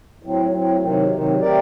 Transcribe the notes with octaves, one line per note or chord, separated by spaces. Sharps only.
A2 F#3 C4
A2 F#3 C4
C3 D#3 F#3
C3 D#3 F#3
A3 C4 G4 A#4 D5